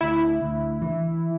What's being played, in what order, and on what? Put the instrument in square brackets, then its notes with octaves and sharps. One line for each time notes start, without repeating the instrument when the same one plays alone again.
[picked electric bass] D2 [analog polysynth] E4
[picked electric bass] D2
E3